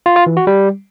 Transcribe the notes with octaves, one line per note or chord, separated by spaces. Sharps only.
F4
F4
E3
F#4
G3